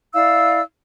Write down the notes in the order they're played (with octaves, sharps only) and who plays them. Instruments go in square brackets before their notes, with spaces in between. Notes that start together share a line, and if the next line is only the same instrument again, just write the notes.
[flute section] E4 D5 F5 E6